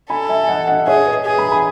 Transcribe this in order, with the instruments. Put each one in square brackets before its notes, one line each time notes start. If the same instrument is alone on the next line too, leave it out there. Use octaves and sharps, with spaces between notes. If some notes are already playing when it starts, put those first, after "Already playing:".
[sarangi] A4 [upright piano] G#5 B5
[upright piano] E5 G#5
G#5
D#5 F#5
D#5 F#5
[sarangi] G#4 [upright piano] C#5 E5
[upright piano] B4 D#5
[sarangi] G#4
[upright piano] G#5 B5
G#5 B5